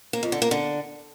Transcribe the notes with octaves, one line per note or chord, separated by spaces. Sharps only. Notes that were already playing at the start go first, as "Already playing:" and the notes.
A#3
F2
D3
A#3
D3